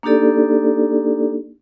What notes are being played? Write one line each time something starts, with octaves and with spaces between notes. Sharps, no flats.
A#3 D4 D#4 G4 A4 D5